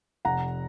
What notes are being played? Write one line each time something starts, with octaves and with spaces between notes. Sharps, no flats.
F1 F#5 A#5